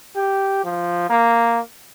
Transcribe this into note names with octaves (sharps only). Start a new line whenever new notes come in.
G4
F3
A#3